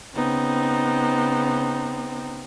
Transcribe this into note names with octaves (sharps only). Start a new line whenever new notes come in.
C#3 B3 C4 D#4